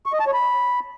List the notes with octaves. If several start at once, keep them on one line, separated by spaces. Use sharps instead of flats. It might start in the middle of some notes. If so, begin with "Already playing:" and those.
C#6
D#5
A5
C#5
B5